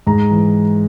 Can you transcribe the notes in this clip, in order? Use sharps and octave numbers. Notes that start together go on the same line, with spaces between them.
G#2 A#5
E3